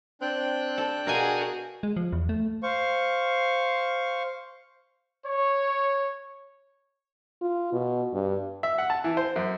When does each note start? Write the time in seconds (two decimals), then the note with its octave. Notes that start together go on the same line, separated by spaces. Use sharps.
0.21 C4 D4 G5 F#6
0.78 A4
1.07 B2 F#4 G#4 A#4 F5 G#5
1.83 G#3
1.97 F3
2.12 E2
2.29 A3
2.63 C5 F5 C#6
5.25 C#5
7.41 F4
7.73 B2
8.13 G2
8.63 E5
8.78 F#5
8.90 A5
9.04 E3
9.17 C5
9.36 F#2